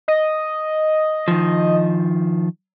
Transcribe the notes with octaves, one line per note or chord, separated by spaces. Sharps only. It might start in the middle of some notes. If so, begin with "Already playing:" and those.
D#5
D#3 F3